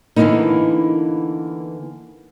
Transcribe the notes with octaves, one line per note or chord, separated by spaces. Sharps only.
D3 E3 F3 A#3 B3 D#4